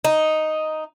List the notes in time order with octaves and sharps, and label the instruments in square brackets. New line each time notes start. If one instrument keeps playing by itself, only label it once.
[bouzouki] D#4